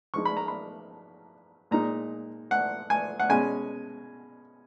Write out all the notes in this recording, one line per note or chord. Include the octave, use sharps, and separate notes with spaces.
F3 G#3 D#4 C#6
B5
A#5
B5
A#2 G#3 D#4 A#5
F#5
G#5
F#5
B2 G#3 C#4 G#5